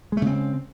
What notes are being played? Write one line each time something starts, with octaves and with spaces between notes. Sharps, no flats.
C#3 G#3 A3 C4